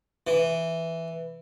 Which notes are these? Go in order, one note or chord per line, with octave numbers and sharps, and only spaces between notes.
E3